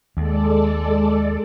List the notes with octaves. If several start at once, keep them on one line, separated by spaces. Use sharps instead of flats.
D#2 G#3 A4 D5